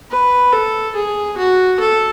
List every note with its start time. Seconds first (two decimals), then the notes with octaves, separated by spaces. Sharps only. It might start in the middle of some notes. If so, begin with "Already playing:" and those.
0.11 B4
0.52 A4
0.95 G#4
1.37 F#4
1.80 A4